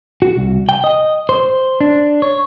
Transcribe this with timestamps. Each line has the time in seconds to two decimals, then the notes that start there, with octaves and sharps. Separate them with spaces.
0.22 F#4
0.37 C2
0.69 G5
0.84 D#5
1.29 C5
1.81 D4
2.22 C#5